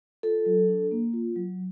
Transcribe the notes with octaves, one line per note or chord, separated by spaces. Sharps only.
F4 A4
F#3
D4
A#3
F4
F#3